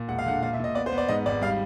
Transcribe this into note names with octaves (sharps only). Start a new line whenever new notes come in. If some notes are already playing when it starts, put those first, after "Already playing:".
Already playing: A#2
E1 F#5
F5
D3 F#5
A#2 F5
E5
A#2 D#5
B3 D5
C5
B3
D5
G#2 D#5
G#1 D5
G3 F5